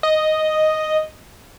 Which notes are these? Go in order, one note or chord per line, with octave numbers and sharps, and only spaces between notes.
D#5